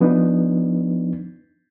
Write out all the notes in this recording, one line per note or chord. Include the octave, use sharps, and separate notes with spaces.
F3 B3 D4 D#4